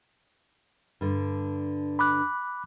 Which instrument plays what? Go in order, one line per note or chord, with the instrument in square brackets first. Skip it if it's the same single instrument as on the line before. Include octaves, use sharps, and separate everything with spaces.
[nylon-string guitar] G2 D3
[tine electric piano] B5 D6 F#6